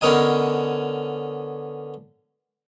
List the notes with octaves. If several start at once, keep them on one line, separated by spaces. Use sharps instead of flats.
D3 B3 C#4 A#4 D#5 G#5